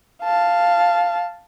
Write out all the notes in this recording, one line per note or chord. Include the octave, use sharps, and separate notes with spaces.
F5 A5